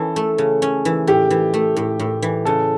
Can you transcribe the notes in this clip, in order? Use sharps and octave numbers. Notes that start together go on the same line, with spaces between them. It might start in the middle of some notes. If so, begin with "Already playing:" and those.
Already playing: E3 C#4 A4
A3
C#3
C#4
E3
A2 G4
E3
A3
A2
A2
E3
C#3 A4